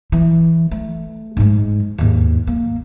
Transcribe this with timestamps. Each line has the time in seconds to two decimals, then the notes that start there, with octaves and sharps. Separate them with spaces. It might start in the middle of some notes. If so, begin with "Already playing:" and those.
0.12 E3
0.71 A3
1.37 G#2 G#3
1.98 D#2 G#2
2.47 A#3